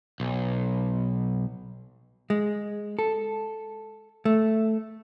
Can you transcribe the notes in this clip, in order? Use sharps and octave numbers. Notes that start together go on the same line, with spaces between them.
B1
G#3
A4
A3